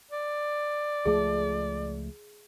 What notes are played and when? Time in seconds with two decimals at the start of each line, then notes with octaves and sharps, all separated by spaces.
0.11 D5
1.05 C#2 F3 A3 G#4